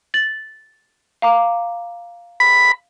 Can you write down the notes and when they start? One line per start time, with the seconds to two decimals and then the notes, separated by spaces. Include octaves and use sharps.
0.14 A6 F#7
1.22 F5 A#5 D6
2.40 B5